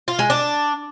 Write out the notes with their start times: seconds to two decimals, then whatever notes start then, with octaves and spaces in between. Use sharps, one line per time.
0.08 F4
0.19 G#3
0.30 D4